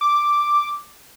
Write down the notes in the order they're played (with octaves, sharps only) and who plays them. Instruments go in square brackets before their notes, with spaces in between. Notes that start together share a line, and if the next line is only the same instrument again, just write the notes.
[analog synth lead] D6